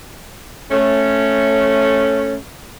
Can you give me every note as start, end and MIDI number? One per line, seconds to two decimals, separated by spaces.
0.71 2.36 57
0.71 2.36 61